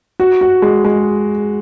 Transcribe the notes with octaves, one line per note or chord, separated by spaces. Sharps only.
F#4
F#4
G#3
G#3